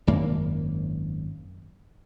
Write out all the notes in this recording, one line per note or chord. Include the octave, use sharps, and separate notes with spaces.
G#1 F#2 A#3